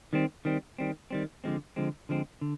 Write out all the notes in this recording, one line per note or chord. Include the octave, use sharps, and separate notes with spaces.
D#3 G3 C4
D#3 G3 C4
D#3 G3 C4
D#3 G3 C4
D3 F3 G#3 C4
D3 F3 G#3 C4
D3 F3 G#3 C4
D3